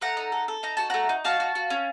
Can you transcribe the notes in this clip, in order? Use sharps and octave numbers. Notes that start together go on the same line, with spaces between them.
A3 F#5 A#5
D#4
A4
A4
D#4 A#5
F#4 A5
A3 F#5 A#5
D#4
F#4 F5 A5
F#4
F#4
C#4